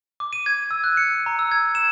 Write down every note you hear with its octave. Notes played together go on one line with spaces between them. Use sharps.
D6
D#7
G#6
E6
F#6
C#7
A#5
E6
G#6
E7